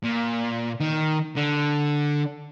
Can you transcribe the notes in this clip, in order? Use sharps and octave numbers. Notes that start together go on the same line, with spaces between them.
A#2
D#3
D3